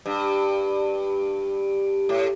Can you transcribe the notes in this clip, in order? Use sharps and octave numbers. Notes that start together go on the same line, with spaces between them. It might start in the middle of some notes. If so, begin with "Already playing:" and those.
G2
A2